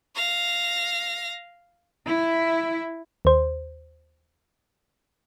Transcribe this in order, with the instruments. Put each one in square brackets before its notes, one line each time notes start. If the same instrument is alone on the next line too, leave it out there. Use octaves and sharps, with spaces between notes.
[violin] F5 A#6
[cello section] E4
[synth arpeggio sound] D#2 C5